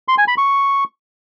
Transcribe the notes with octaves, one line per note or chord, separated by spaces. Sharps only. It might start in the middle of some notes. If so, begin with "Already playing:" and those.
C6
G#5
B5
C#6